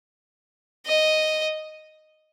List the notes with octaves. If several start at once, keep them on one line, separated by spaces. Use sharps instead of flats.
D#5